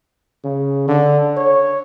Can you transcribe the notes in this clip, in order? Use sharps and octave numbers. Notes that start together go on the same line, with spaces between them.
C#3
D3
C#5